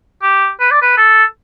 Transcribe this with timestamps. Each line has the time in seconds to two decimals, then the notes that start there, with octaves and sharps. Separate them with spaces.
0.23 G4
0.60 B4
0.71 D5
0.82 B4
0.97 A4